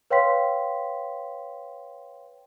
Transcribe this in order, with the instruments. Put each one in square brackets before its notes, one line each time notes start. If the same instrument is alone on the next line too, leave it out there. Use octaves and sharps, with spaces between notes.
[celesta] B4 C#5 F5 G5 C6 B6